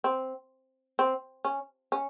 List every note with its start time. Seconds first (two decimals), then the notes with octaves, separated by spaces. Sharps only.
0.04 C4
0.99 C4
1.45 C#4
1.92 C#4